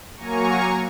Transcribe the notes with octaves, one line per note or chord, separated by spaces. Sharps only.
F#3 A#3 G#5 A#5 C#6